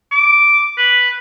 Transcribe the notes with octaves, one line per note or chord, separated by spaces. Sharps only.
D6
B4